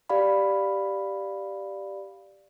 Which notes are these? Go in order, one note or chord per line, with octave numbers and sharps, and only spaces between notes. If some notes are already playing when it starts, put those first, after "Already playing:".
G4 D5 F5 B5